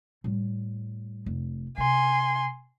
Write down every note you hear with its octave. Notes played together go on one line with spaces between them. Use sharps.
A2 G3
F1
C3 G#5 C6